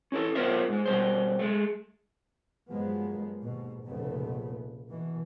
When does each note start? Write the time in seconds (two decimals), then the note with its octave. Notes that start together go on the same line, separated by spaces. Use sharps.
0.12 C#4 E4 A4
0.35 B3 F4 A#4 C5 E5
0.68 G#2 G#3
0.86 B2 G3 C5
1.39 G#3 A3
2.69 G2 F3 F#3 G#3 A#3 B3
3.42 D#2 G#2 B2
3.84 F1 B1 A#2 C#3 A3 B3
4.91 B2 E3